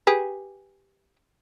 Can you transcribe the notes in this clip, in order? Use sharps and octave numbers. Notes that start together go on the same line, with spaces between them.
G4 G#4 B4